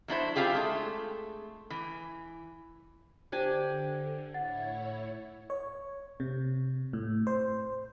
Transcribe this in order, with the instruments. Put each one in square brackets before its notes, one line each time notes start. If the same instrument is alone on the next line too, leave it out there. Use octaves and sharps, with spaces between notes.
[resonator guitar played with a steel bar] F#3 D4 E4 C5
C4 D4 E4 F4 G4 G#4
G#3 A3
E3
[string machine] D3 [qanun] D4 G4 G#5 [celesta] C5
[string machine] A2 E4 C#5 [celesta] F#5 A6
[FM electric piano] C#5
C3
A2
C5